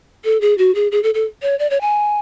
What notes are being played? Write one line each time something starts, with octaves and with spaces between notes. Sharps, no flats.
A4
G#4
F#4
G#4
G#4
A4
A4
C#5
D5
C#5
G#5